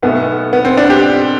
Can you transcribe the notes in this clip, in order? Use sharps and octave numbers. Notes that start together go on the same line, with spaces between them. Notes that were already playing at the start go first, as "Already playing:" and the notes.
B1 B2 A3 B3
B3
C4
D4
G4